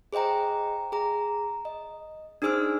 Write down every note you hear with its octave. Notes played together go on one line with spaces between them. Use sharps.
G#4 C5 D#5 G5 A#5
G#4 A#5
D#5
D4 D#4 G#4 C5 E6 F6